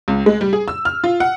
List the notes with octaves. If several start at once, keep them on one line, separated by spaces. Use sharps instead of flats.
C#2
G#3
G3
G#4
E6
F6
F4
F#5